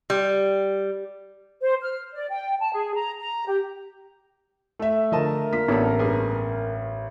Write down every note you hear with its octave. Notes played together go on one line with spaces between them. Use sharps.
G3
C5
F6
D5
G5
A5
G#4
A#5
A#5
G4
A3 E5
D3 F3 F4 A#4 D#5 A5
A#3 D4 F4 B6
A1 B3 C#4 D4 A4
G2 G#4